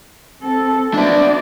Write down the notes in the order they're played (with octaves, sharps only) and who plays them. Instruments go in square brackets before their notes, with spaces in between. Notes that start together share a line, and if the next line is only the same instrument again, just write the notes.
[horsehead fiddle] C4 A4
[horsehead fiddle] B3 D5 [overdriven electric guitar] D4 E5